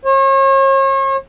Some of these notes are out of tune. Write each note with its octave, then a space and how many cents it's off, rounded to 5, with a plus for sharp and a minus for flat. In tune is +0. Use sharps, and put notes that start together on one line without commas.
C#5 -40